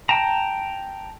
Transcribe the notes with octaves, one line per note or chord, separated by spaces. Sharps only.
G5 A5 A#5